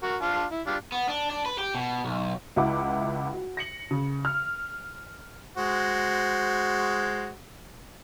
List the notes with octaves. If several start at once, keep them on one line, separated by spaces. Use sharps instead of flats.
F#4 A#4
D4 F4 A5
E4
G3 D4 F4
B3
D4
D4
B4
G4
B2
B1
C#2 E4 F#5 D6
F#4
A#6 C#7 F#7
C#3
F6
G#3 F#4 C5